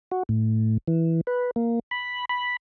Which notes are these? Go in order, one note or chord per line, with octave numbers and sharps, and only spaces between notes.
F#4
A2
E3
B4
A#3
B5
B5